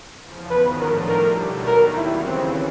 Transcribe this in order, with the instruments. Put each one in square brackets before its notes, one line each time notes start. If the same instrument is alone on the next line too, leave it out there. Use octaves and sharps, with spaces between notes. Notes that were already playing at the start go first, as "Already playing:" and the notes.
[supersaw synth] E2 C#3 F3
[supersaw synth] G#2 D#3 F#3 B3 [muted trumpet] B4
[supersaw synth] A2 F3 A3 D4 F4 [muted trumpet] A#4
[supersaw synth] D#2 D3 G3 [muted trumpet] A#4
[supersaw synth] B2 F#3 A3
[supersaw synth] D#2 D#3 G3 [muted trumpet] A#4
[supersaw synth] E2 C#3 F#3 [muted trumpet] E4
[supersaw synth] D#2 C#3 E3 [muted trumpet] C4